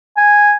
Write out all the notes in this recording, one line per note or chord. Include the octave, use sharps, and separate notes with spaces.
G#5